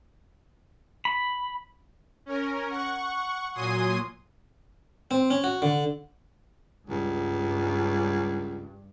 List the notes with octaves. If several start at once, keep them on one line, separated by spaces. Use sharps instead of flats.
B5
C#4 A#4
F#5 C#6
A#2 F#3 G#5 C6 D#6 D#7
C4
C#4
F#4
D3
C#2 G2